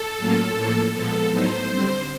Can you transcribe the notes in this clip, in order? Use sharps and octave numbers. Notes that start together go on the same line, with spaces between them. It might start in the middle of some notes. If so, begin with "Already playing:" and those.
Already playing: A4
A2 F#3 A#3 C#4 F4
A2 F3 A#3
A#2 F3 G#3 B3 A4
A2 F#3 B3 D#4 C5
D3 G3 C4